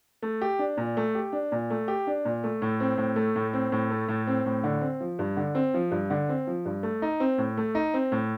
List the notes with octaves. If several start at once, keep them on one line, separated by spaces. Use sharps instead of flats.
A3
G4
D4
A#2
A3
G4
D4
A#2
A3
G4
D4
A#2
A3
A2
C4
A2
A3
A2
C4
A2
A3
A2
C4
A2
D3
C4
F3
G2
D3
C4
F3
G2
D3
C4
F3
G2
A3
D#4
C4
A2
A3
D#4
C4
A2